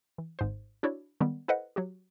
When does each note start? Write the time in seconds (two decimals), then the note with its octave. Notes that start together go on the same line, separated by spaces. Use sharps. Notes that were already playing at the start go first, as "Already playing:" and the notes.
0.18 E3
0.39 G#1 G#2 C5
0.83 D4 E4 F#4 C#5 D5
1.21 D#3 G3 G#3 B3
1.48 E4 A4 B4 C5 D#5 F#5
1.76 F#3 F#4 G4